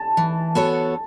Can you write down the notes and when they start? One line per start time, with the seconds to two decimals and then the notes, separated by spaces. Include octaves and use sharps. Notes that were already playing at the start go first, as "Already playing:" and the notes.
Already playing: A5
0.17 E3
0.55 B3 F#4 A4 C#5